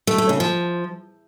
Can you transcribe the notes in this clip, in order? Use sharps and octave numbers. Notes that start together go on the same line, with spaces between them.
A3
A3
C#3
F3